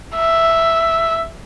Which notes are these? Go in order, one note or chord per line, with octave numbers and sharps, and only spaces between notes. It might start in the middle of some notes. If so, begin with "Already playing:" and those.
E5